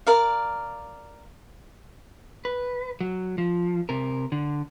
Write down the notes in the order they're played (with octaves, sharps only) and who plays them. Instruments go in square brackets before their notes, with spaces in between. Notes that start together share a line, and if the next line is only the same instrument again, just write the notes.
[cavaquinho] A#4 D5 F5
[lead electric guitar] B4
F#3
F3
C3 A#4
D3